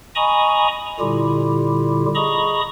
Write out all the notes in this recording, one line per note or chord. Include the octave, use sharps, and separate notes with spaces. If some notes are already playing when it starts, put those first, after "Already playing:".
D#5 G#5 A#5 B5 C#6 D#6
A#2 D3 G3 E4 F4 G4
G#4 D#5 A#5 B5 C#6 D#6